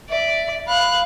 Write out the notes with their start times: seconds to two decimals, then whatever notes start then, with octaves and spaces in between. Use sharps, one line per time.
0.10 D5 E5
0.67 F5 B5 F#6